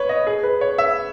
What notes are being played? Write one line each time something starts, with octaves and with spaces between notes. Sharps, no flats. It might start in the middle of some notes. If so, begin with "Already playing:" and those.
Already playing: B4 C#5
D#5
G#4
B4
C#5
E5